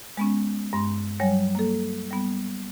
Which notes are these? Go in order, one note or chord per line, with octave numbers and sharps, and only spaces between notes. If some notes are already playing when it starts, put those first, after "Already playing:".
G#3 B3 C#4
G2 G#3 C6
F#3 G3 C#5 G#5
A#3 A4
G3 B3